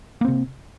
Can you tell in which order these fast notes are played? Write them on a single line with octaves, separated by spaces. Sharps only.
A#3 C4 C3